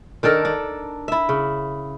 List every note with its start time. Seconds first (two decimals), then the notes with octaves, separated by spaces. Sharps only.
0.23 D#3 D4 A4 A#4
0.45 D4
1.08 E4 E5
1.29 C#3